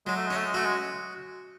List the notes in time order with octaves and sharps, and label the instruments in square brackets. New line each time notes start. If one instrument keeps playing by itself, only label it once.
[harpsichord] F#3 [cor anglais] G#3
[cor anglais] A3
[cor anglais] G#3 [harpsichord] C#4
[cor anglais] A3
G#3
[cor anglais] A3 [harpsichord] F#4
[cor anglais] G#3